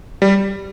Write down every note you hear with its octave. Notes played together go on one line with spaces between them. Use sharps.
G3